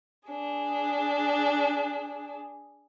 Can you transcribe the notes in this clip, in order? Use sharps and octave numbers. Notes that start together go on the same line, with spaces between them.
D4 G#4